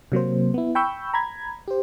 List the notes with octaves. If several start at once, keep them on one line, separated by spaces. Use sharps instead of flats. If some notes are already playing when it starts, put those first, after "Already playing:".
C3 F#3 A#3 C5
B3 E4
G5 B5 C#6 E6 G6
A#5 B5 G#6
G4 C5